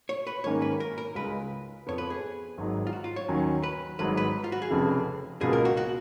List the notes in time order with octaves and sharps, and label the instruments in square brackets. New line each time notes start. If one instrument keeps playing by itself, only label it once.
[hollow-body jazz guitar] C#5
B4
[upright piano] G#2 D#3 A#3 C#4 [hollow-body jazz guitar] C#5
[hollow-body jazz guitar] B4
A#4
A#4
[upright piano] C#2 C#3 G#3 [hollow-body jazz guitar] B4
[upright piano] F2 F3 B3 [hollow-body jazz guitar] C#5
[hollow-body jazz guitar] B4
G#4
[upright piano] G#1 G#2 D#3 F#3
[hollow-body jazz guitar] F4
F#4
F4
C#5
[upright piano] D#2 D#3 F#3 C#4
[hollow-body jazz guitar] B4
[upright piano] G#1 G#2 F#3 [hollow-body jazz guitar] B4
[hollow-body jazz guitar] B4
F4
F#4
G#4
[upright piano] F1 F2 C#3
[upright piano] C#2 B2 A#3 F4 [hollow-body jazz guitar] G#4
[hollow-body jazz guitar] A#4
F#4
F#4